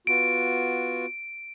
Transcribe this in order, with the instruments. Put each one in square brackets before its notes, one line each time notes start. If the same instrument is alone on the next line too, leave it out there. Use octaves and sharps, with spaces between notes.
[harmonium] B3 F4 F#4 [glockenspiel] D7